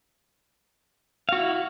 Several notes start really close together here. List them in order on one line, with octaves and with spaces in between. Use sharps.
F5 F#4 E4